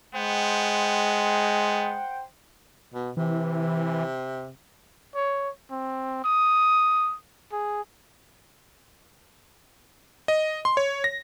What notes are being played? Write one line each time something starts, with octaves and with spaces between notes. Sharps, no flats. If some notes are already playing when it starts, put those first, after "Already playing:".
G#3 B3 C5 F#5 G5
B2
C3 E3
C#5
C4
D#6
G#4
D#5
C6
C#5
A#6